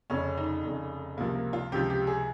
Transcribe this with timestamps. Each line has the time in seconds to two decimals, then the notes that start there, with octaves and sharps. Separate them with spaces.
0.10 F1 F2 C#3 C#4
0.37 D#4
0.64 F1 F2 C#3
1.17 C#2 C3 F3 A#3
1.35 A#3
1.53 F4
1.72 C#2 C3 F3 G4
1.90 G4
2.07 G#4